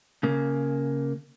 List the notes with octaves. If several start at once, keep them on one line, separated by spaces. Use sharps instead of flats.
C#3 A#3